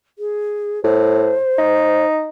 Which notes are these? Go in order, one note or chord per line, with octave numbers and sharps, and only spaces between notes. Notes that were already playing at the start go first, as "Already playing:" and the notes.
G#4
A2 C5
D#4